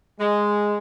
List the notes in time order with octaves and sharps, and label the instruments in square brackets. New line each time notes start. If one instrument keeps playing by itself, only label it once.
[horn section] G#3